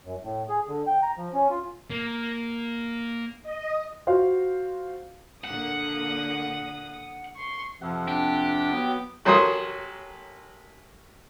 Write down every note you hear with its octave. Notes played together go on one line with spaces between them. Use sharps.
F#2
A2
G#4
D3
G5
A#5
F3
C#4
F4
A#3
D#5
F4 F#4 C5 F5
A#2 D3 A#3 F#5 D#6
C6 C#6
F2 C3 F3 F#5
D4 G4
F#3 B3
A1 F#3 A#4 C5 C6 D#6